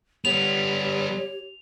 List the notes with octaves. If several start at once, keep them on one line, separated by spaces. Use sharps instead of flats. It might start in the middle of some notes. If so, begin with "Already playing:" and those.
G3 B3 G4 C#5 F7